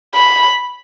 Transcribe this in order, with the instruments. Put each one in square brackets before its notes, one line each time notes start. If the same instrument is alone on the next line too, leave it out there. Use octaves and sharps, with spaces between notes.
[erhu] B5